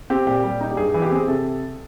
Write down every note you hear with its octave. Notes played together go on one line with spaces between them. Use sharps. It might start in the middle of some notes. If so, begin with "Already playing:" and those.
C4 G4
A#2 G4
G3
D#4
G4
G2 G#4
E3
G4
C4 G#4
C3 A4